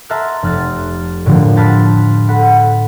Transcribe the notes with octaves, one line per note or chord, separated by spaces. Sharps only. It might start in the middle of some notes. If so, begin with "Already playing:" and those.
E5 A5 A#5 C6 F6 F#6
F1 F6 F#6 A6
A2 D3 F3 A#3
G5 A5 B5 C6 F6 F#6
A4 F#5 B5